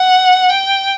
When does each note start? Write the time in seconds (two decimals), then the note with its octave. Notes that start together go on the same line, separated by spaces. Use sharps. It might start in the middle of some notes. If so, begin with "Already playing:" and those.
Already playing: F#5
0.50 G5